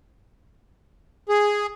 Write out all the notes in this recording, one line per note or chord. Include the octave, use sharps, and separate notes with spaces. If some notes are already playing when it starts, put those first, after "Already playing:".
G#4